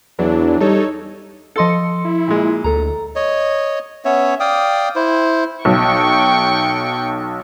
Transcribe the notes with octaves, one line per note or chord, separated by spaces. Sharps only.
E2 E3 F#3 D4
G3 D#4 A4 C#5
F3 A4 D#5 C6 C#7
E4
A#2 G#3
D2 A4 A#5
C#5 D#5
B3 C#4 C#5 E5
D5 F5 G5 D#6
E4 C5
B1 G5 C#6